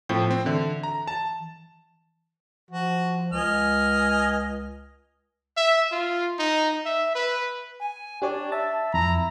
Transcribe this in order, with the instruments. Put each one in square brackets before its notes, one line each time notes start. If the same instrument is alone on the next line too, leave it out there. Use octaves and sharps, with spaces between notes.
[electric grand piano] A2 F3 C4 [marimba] G5
[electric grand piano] C4
[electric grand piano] D3 [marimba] E3
[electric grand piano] A#5
A5
[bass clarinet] F3 [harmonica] F#4
[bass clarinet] C#2 [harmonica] D#5 G#5 F6
[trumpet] E5
F4
D#4
E5
B4
[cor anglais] G#5
[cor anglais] D4 [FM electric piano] G4 C#5 D5
[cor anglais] E5 [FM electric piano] A5
[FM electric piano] F2 [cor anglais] E4 [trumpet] A#5